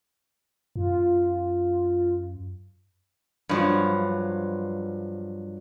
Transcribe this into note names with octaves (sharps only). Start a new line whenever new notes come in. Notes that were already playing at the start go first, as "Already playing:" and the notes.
F#2 F4
G2 F3 F#3